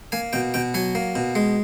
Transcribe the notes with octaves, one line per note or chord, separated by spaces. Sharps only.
A#3 G#5
B2 G5
B2 G5
F#3 G#5
A#3
B2
G#3